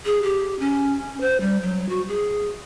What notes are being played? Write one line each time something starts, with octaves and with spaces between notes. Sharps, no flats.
G#4
G4
C#4
C5
G3
F#3
F#4
G#4